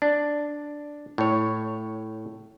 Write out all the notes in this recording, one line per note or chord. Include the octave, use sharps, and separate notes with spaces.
D4
A2 C#5